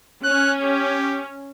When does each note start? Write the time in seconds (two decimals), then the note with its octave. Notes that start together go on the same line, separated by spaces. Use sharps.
0.24 C#4 F#6
0.63 G4